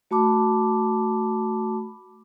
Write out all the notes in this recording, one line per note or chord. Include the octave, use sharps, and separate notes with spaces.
A3 F#4 A5 B5 D6